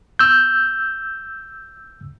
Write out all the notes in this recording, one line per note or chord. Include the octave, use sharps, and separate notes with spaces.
E6 G6